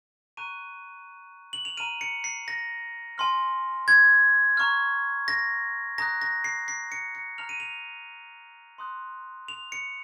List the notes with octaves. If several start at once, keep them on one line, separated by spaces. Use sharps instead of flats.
A#5 C#6 F#6 D#7
F#7
F7
A#5 F6 D#7
C#7
C7
A#6
G#5 C6 F6
G#6
A#5 C#6 F6
A#6
A#5 D#6 F#6 A#6
A#6
C7
C7
C#7
C#7
A#5 F6 F7
D#7
F7
C6 D#6 F#6
F7
C#7